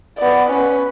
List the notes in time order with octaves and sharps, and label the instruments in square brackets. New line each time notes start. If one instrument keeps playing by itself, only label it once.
[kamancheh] B3 D5
C#4 B4